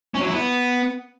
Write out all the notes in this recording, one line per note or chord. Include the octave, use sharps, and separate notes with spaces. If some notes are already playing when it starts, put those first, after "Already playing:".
C#4
F#3
E4
B3